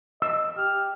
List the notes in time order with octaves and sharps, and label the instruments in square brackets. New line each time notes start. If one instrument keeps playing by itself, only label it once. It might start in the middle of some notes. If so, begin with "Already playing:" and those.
[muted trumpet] D#5 [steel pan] E6
[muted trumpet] G4 [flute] F6